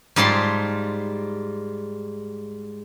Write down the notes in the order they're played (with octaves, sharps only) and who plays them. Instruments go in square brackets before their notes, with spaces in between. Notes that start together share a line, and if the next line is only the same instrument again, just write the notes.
[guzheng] G#2 G3 F4 A5 C6